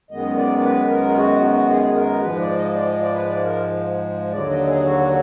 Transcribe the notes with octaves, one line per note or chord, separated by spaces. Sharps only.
F#2 D#3 G#3 B3 D#5
D5
D5
B4
A#4
G#4
F#4
F#4
G#4
A#4
G#2 F3 G#3 B4
D5
D#5
D5
D#5
D5
B4
D5
A#4
D#2 D3 F#3 D5
D#5
G#4
F#4